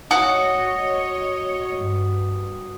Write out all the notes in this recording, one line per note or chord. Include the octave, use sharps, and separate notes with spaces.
F#4 C#5 D#5 D#6
G2